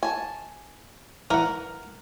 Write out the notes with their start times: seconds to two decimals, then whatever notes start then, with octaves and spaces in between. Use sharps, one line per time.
0.03 G#5 A5
1.31 E3 A#4 F#5